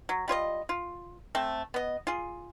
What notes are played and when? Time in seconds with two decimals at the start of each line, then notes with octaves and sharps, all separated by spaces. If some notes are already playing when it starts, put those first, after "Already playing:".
0.09 F#3
0.28 G3 F4 C#5 D#5
0.69 F4
1.35 A3 C4 A4
1.74 B3 D#5
2.07 F4 G#4